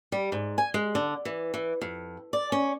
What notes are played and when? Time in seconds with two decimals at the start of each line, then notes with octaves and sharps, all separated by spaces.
0.12 G3
0.32 G#2
0.58 G#5
0.74 G#3
0.95 D3
1.25 E3
1.54 E3
1.81 F2
2.33 D5
2.52 C#4